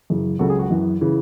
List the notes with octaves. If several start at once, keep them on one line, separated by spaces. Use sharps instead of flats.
F#2 C#3 E3
C#2 C#3 F#3 F#4 A4
G#4
F#4
F#2 E3
C#3 E3